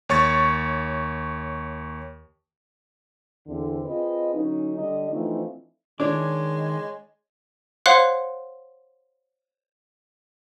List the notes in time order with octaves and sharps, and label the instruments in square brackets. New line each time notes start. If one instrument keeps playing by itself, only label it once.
[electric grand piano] D#2 C#5 C#6 A6
[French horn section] E2 D3 C4
C4 F4 G#4 B4 D#5
D3 F#3 C#4 D#4
D3 G3 D4 D#5
E3 F3 A3 C4 D4 D#4
[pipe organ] D#3 [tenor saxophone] G#3 [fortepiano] D4 [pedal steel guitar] C#5 D6
[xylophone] C5 C#5 F5 F#5 C6 F#6